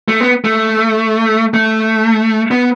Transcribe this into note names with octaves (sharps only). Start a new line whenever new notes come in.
A3
B3
A3
A3
B3